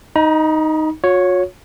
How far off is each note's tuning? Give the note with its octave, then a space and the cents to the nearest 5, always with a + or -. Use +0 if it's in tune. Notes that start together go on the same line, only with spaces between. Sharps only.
D#4 +0 A#5 +45
F#4 -45 C#5 +0